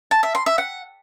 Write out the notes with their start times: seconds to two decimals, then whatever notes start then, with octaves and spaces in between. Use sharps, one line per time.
0.11 A5
0.23 E5
0.35 C6
0.46 E5
0.58 F#5